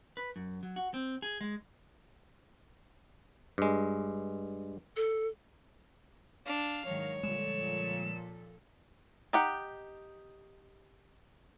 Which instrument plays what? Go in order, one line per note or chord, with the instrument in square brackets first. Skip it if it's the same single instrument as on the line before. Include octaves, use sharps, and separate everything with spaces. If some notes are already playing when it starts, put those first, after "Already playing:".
[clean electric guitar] B4
F#2
F#3
F#4
C4
G#4
G#3
[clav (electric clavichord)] G2 G#3
[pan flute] A4
[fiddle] D4 [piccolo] F5
[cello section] G#2 D#3 F#3 [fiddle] C#5
[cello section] A#2 F3 A4 [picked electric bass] D3 G3 G#3 [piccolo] E7
[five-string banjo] D#4 G4 F#5